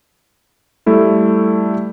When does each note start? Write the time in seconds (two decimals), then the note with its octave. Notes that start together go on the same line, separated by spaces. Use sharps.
0.86 G3 A3 E4 A4